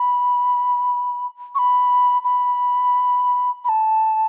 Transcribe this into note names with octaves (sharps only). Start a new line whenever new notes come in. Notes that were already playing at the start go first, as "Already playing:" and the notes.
Already playing: B5
C#6
B5
B5
B5
A5